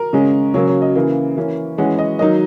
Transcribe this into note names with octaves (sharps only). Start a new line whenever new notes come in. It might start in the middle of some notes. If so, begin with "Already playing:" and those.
Already playing: A#4
C#3 G#3 C#4
C#3 F#3 A#3 C#5
C#5
D#5
C#3 E3 A#3
E3 A#3 C#4
E3 G#3 C#4 F#5
D#5
D#3 F#3 A#3 D#4 D#5